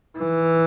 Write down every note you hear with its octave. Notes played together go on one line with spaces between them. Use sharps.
E3